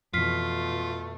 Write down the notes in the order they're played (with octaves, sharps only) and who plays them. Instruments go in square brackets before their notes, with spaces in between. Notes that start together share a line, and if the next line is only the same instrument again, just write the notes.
[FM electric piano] F2 E3 [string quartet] B2 A3 [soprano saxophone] F4 [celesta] F6 B6 C7